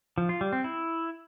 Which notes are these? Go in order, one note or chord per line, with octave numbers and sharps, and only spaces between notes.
F3
F4
G3
C4
E4